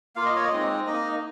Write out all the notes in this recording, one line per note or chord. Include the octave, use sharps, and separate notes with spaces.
A#3 F4 F5
D#5
C#5
D#5
G#3 C4 D#4
A#3 D#4 D#5